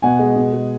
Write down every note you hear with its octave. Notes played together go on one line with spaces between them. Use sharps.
B2 F#5 G#5
G#3
B2
G#3